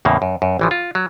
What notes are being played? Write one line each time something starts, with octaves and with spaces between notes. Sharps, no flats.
E2 A2 C#3 A#3
F#2
F#2
A1 E3 F3
F4
F#3